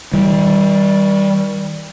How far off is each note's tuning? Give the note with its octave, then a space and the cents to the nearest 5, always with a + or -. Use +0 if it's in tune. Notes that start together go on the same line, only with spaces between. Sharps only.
D#3 +45 G3 +0